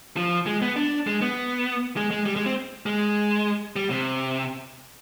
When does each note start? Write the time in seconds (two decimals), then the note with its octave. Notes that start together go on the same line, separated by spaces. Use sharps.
0.17 F3
0.46 G#3
0.62 B3
0.76 D4
1.07 G#3
1.22 B3
1.97 G#3
2.11 G#3
2.26 G3
2.36 G#3
2.46 C4
2.86 G#3
3.76 G3
3.91 C3